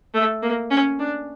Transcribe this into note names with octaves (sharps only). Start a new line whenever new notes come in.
A3
A#3
C#4
D4